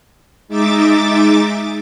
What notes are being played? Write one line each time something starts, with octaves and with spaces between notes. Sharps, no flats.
G#3 D#4 E5 D6 A6